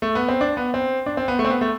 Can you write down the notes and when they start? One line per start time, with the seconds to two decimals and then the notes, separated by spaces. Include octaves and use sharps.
0.02 A3
0.15 B3
0.28 C4
0.41 D4
0.57 B3
0.74 C4
1.06 D4
1.17 C4
1.28 B3
1.39 A3
1.44 C4
1.50 B3
1.61 A3